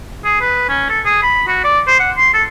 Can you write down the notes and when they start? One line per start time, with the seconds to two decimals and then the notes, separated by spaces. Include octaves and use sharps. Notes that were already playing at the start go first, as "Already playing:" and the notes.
0.25 G#4
0.41 B4
0.69 C#4
0.90 A4
1.06 G#4
1.23 B5
1.48 F#4
1.64 D5
1.87 C5
2.00 F#5
2.17 C6
2.34 A4